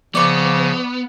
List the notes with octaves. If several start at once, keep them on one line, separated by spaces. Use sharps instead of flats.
C#3 F3 B3 D5 C#6